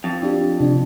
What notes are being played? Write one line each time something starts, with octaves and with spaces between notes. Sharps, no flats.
F2
D4 G4
C3 D4